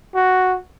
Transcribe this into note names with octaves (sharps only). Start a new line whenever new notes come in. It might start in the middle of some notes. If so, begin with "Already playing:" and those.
F#4